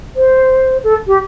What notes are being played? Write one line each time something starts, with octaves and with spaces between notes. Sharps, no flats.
C5
A4
G4